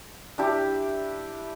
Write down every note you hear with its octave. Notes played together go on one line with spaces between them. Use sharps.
D4 E4 G4